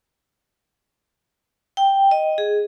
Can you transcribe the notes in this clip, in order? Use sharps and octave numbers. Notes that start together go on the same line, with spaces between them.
G5
D#5
G#4